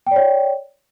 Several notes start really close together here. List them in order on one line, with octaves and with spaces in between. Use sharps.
G5 D5 C#5